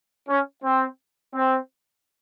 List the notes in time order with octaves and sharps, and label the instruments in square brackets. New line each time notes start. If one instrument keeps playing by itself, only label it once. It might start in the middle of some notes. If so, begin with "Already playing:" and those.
[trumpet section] C#4
C4
C4